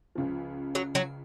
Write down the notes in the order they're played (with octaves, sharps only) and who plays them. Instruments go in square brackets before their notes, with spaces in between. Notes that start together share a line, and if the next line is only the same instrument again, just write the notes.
[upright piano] C#2 C#3 F3
[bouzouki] F#3
F#3